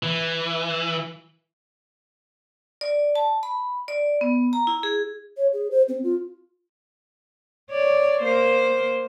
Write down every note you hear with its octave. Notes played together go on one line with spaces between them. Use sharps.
E3
D5
A5
B5
D5
B3
A#5
E4
G#4
C#5
G#4
C5
C4
F4
C#5 D5
A#3 C5